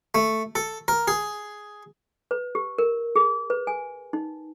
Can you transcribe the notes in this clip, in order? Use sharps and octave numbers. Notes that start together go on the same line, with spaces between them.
A3
A4
A#4
G#4
B4
G4
A#4
G#4
B4
G#5
D#4